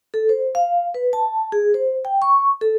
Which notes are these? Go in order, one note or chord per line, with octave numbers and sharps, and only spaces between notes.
A4
C5
F5
B4
A5
G#4
C5
G5
C#6
A4